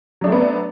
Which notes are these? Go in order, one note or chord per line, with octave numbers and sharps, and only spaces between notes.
F#3 A3 B3 C4 D4